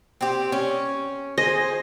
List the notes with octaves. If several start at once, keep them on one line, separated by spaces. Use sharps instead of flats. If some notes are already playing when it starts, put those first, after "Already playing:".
C4 G4
C#4
G#4 C5 D#5